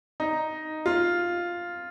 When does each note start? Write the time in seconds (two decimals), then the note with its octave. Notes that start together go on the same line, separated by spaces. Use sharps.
0.20 D#4
0.86 F4